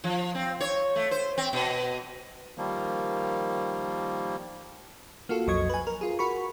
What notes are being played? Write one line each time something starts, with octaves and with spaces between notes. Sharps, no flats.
F3
C4
C#5
A3
C5
C4
B2
D#3 F3 G3 A#3
A#3 F4 F#4 A4
B1 F2 F#3 D#5 C#6 G#6
B4 G#5
A#4
F4 G#4
F#4 A#4 B5 C#6